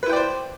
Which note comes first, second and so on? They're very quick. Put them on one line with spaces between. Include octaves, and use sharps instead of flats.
B4 E4 G5 D5 C5